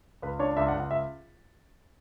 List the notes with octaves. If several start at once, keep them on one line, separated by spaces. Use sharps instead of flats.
C#2 B4
D4 C#5
C#2 E5
F#5
C#2
F#5
E5